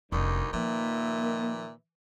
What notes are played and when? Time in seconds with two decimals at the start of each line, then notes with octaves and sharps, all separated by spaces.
0.12 F1 D2 G3 A#3 C#4 D#4
0.53 A#2 D#3 F3 A#3 B4 E5